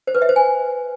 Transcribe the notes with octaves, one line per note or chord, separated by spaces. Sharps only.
C5
B4
E5
C5
G#5